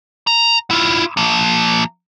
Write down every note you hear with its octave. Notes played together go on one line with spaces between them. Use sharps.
A#5
E4 F4
F3 A#3